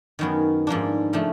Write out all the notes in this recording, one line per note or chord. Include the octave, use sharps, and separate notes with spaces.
F#2 D#3 F#3 B3
G#2 F3 A#3 D4
C#3 F3 A3 D4